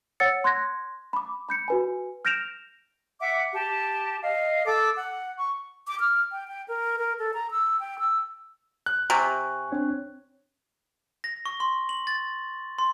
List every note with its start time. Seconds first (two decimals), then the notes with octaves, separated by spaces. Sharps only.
0.20 C#5 F#5 E6 A6 C#7
0.44 C6 F#6 G#6 A#6
1.13 B5 D6
1.49 B5 G6 C#7
1.68 F#4 B4 G#5
2.25 F6 G6 A#6 D7 E7 F7
3.20 E5 F#5 D6
3.53 G4 A5
4.23 D#5 F5
4.65 A4 D6 E6
4.97 F#5
5.37 C#6
5.88 D6
6.00 F6
6.32 G5
6.48 G5
6.68 A#4
6.99 A#4
7.19 A4
7.34 A#5
7.51 E6
7.80 G5
7.99 E6
8.86 F#6
9.10 C3 G#5 C#6
9.72 C4 D4 C#5
11.24 A#6
11.46 C#6
11.60 C6
11.89 F#7
12.07 A6
12.78 C6